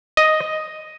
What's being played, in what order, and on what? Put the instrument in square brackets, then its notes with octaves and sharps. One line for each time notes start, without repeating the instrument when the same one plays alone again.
[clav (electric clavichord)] D#5